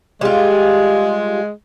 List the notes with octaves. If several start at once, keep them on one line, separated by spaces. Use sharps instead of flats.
G3 G#3 F4